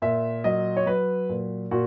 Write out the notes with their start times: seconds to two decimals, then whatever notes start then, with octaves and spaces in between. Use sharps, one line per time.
0.02 A#2 E5
0.44 F#3 D#5
0.77 C#5
0.86 F#3 B4
1.29 A#2
1.71 A#2 F#4